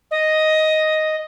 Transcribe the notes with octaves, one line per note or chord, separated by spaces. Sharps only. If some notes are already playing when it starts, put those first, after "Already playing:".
D#5